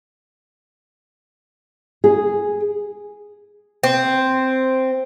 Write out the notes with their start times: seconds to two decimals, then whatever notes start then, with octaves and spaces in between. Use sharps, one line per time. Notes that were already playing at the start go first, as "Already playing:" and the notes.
2.04 G#4
3.84 C4